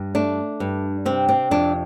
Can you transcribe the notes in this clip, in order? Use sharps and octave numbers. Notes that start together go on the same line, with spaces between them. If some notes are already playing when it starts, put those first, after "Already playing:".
Already playing: G2
A3 D4
G2
C3 C4
C4
F2 D4